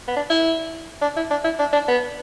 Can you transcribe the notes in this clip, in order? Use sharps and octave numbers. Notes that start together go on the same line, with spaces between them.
B3
D4
E4
D4
E4
D4
E4
D4
D4
B3